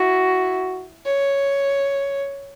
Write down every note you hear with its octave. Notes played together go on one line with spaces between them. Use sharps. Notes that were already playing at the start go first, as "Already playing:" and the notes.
Already playing: E4 F#4
C#5